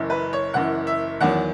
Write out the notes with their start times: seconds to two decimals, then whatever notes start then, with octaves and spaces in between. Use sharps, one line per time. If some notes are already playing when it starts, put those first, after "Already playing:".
Already playing: F#1 F#2 E3
0.10 B4
0.33 C#5
0.54 F#1 F#2 E3 F#5
0.87 E5
1.21 E2 D#3 F#3 F#5